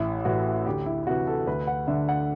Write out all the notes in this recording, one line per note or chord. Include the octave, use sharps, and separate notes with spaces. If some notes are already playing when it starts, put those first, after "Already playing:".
Already playing: A1 E4
A2 E3 F#4
D2 G4
E4
C3 E3 F#4
A4
D2 B4
F#5
D3 E5
F#5